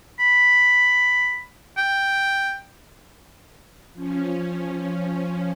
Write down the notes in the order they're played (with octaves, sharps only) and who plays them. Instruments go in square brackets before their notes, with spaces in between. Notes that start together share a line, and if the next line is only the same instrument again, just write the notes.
[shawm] B5
G5
[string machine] F3 C#4